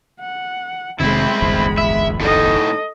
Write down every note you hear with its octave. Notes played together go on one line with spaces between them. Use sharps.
F#5
F1 C3 D#3 G#3 C4 E4 B5
D1 G1 E2
E5
A2 D#4 A4 D#5